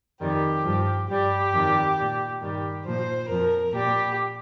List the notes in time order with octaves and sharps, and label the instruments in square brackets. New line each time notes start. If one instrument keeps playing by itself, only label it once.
[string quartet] F2 D#3 G3 G4
G2 F3
G2 G3 G4
F2 D#3 G3
A#2 G3
G2 D#3 G3 G4
A#2 F3 C5
F2 F3 A#4
A#2 G3 G4